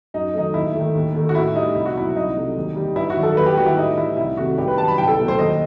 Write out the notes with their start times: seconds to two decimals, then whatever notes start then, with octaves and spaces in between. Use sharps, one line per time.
0.14 F#2 D#4
0.34 D#3 F#3 A3 D#4
0.54 D#2 E4
0.74 D#3 A3
0.95 D#2
1.15 D#3 A3
1.29 F#4
1.35 A2 E4
1.55 G3 D#4
1.75 C2 E4
1.86 F#4
1.96 B2 F#3 E4
2.16 C2 D#4
2.36 C3 F#3 A3
2.57 D#2
2.76 D#3 G3
2.96 G2 E4
3.10 F#4
3.17 D#3 F#3
3.23 A4
3.37 D#2 B4
3.46 G4
3.57 D#3 G3 F#4
3.66 E4
3.77 A2 D#4
3.97 E3 G3 E4
4.17 C2 E4
4.37 C3 D#3 A3 F#4
4.58 G2 G4
4.68 B4
4.77 D#3 F#3 A5
4.88 B5
4.97 C2 G5
5.08 A4
5.18 B2 F#3 A3
5.28 C5
5.38 D#2 D#5